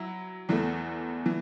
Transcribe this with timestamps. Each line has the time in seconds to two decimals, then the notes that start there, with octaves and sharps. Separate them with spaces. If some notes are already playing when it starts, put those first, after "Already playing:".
Already playing: F#3 E4
0.49 E2 E3 A3
1.26 E3